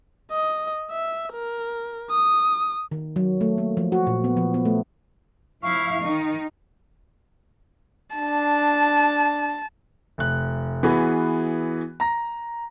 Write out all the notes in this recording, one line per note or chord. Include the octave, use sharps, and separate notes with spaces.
D#5
E5
A#4
D#6
D#3
F#3
A3
A#3
F3
F#4
A#2
B3
F3
B3
A3
F3 E4 F5 C#6
D#3 D#4
D4 A5
F1 F#6
E3 B3 F#4 G#4
A#5 A#6